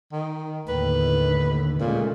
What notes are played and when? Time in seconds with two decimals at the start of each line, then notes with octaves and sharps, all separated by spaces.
0.12 D#3
0.68 D#2 A2 D3 B4
1.80 A#2 C#3 G#3 A3